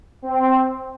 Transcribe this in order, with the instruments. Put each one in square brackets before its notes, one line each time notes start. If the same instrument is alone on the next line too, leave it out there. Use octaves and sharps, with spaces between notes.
[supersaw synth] C4